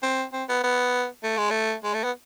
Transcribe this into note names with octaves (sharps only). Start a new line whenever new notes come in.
C4
C4
B3
B3
A3
G#3
A3
G#3
A3
B3